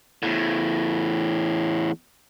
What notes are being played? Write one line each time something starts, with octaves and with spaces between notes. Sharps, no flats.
E2 A2